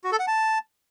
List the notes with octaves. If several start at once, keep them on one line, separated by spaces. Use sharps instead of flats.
F#4
A4
F#5
A5